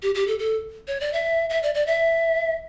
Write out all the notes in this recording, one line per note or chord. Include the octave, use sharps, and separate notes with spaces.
G4
G4
A4
A4
C#5
D5
E5
E5
D5
D5
E5